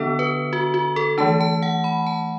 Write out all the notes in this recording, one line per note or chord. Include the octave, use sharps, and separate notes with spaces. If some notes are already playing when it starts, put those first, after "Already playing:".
Already playing: D3 B3 D4 A4
B4
F#4
F#4
A4
E3 A3 D4 A5
A5
F#5
B5
A5